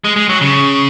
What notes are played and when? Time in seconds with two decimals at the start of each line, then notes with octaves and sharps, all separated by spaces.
0.04 G#3
0.16 G#3
0.29 F#3
0.41 C#3